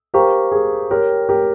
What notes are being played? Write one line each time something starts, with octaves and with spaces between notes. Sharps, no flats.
G4 A#4 C5 F5 A#5 C#6
G#4
G4 A#4 C#5 G5 C6
G4 A#4